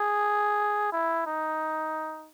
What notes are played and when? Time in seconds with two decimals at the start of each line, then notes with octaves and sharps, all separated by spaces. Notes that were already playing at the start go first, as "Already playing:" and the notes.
Already playing: G#4
0.92 E4
1.26 D#4